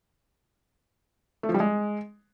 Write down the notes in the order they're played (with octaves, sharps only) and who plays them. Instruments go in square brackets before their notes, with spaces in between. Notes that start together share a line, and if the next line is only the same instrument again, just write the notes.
[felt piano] A3
F3
G3
G#3